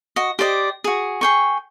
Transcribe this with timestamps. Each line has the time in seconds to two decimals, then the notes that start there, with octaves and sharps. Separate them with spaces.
0.16 F#4 D#5
0.39 G4 C5 D5 D#5
0.84 F#4 G#4
1.21 G#4 G5 C#6